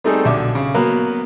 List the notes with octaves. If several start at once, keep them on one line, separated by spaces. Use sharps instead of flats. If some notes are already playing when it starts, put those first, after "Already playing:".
G3 A3 C4 D#4 G#4 A4
B1 D3 E5 D6
C#3
F#3 A#3 B3 B4